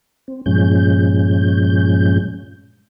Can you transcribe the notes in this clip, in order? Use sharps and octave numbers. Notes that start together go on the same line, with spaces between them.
C4
G2 A#2 F3 G#3 C#4 G6